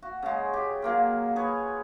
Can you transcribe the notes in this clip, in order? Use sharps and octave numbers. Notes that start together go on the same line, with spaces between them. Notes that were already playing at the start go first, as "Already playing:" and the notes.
F#4
C#3 G#3
G4
F#3 A#3 F4
G#4 B4 C#5